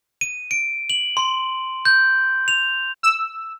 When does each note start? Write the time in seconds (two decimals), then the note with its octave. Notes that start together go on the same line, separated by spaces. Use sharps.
0.21 D#7
0.51 D7
0.90 F#7
1.17 C6
1.85 G6
2.48 F7
3.03 E6